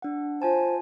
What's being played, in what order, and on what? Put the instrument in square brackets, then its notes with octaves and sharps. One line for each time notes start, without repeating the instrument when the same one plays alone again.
[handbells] D4 F#5
[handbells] F4 G#5 A5 [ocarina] C5